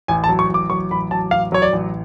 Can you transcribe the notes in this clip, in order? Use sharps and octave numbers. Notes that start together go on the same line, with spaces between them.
A1 G#5
A5
F#3
C#6
A1 D6
F#3 C#6
A1 B5
F#3 A5
A1 F5
F#3 C#5
D5
A1